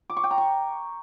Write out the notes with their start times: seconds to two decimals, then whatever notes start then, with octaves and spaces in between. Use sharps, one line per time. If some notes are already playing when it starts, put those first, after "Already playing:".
0.10 D6
0.17 C#6
0.24 G5
0.31 A#5
0.38 C#6